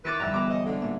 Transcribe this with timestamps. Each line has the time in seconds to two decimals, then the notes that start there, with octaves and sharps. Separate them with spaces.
0.05 D#3 E4 B4 D6 A6 B6
0.20 F2 G#2 D3 G3 E5 A#5
0.32 E1 B3 A#5 D6 E7
0.51 C#3 D#5
0.66 G#2 D3
0.82 A#2 A#3 E5